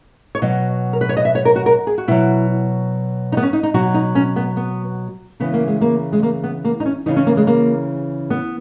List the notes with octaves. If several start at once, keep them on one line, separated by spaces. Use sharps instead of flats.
C#5
B2 F#3 D#5
A#4
B4
C#5
D#5
E5
C#5
A#4
F#4
A#4
G#4
F#4
B2 F#3 E4
D#4
B3
C#4
D#4
D#4
B2 F#3 F#4
D#4
C#4
B3
B3
C#3 E3 B3
A#3
G#3
A#3
G#3
A#3
B3
A#3
D#4
C#4
C#3 E3 D#4
C#4
A#3
G#3
A#3
B3